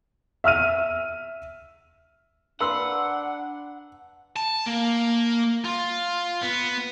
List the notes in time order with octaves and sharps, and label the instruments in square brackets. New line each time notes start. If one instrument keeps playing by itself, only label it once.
[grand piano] E5 E6 F6 D#7
[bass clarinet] D4 [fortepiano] B4 C6 [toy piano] F5 A#5 E6 [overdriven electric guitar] F#5
[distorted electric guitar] A5
A#3
F4
B3